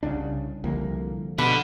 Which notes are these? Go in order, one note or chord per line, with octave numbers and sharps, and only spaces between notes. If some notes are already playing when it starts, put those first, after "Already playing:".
C2 C#3 D4
C2 D3 F3 A#3
B2 D3 B4 F5 F#5